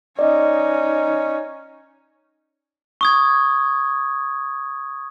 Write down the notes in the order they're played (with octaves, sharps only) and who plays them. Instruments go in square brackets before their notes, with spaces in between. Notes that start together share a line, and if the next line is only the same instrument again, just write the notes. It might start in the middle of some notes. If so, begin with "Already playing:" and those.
[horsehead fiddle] C#4 D#4 [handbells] D5 D#5
[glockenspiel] C#6 D#6 G#6